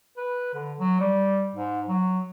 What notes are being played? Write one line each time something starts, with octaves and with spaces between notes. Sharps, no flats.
B4
D3
F#3
G3
G#2
F#3